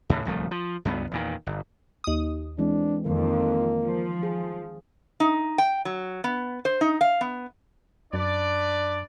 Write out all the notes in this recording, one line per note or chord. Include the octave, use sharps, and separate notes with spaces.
D#2 A2 C#3
D1 C2 F3 A3
F3
C#2 G2 G#3 B3
E2 A#2 D#3
G1
D#2 D#6
E3 G#3 C4 D4
F2 D#3 A#3
F3
G#4
D#4
G5
F#3
B3
C5
D#4
F5
B3
F#2 D4 B4 D5